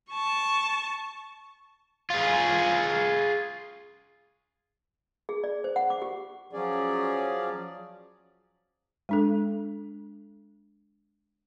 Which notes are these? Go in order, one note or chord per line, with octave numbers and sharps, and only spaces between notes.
A5 C#6
F4 G#4
G#4
D5
C5
F#5
D6
G4
F3 F#3 C#4 G#4 D5
G#3 D4 A4